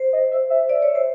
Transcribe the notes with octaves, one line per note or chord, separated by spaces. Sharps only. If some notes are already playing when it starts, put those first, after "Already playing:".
Already playing: C5
D#5
E5
E5
D5
C#5
C5